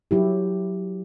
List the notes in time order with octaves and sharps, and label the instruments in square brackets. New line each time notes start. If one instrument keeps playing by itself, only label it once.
[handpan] F#3 E4 G4